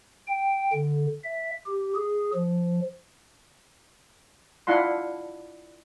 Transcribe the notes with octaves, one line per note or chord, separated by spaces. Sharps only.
G5
D3
E5
G4
G#4
F3
D4 E4 F4 F#5 C6